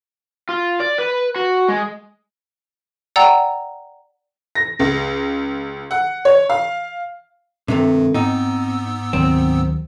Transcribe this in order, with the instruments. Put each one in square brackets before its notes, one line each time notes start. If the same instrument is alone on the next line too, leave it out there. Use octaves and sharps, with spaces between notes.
[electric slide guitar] F4
D5
B4
F#4
G#3
[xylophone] D5 F#5 G5 A#5 E6
[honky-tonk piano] A#6
C#2
F#5
C#5
F5
[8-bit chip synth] G2 [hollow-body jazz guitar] C3 D#3 A3 [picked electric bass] G#3 C4
[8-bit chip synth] G#2 B3 E6 [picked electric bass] C4 [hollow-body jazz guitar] D#4
[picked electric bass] D2 D#3 F#3 [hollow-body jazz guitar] C4